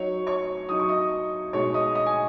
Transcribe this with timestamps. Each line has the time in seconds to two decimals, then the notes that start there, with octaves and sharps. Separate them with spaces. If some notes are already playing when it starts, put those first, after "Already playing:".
Already playing: F#3 D#4 C#5 C#6
0.27 C#5 C#6
0.69 F#3 D#4 D#6
0.79 C#6
0.89 D#5 D#6
1.53 B2 G#3 D#4 C#5 C#6
1.74 D#5 D#6
1.95 D#5 D#6
2.06 G#5